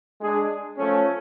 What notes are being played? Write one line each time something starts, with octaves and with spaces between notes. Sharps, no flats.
G#3 D4 G#4
F3 A3 C#4